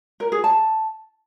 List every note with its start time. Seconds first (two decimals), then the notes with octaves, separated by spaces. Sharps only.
0.20 A#4
0.32 G#4
0.44 A5